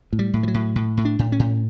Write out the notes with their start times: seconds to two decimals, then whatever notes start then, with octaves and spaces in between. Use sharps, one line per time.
0.13 A2
0.19 G3
0.34 A2
0.43 F3
0.48 F#3
0.54 A2
0.76 A2
0.97 A2
1.05 D4
1.19 A2
1.32 C#4
1.39 A2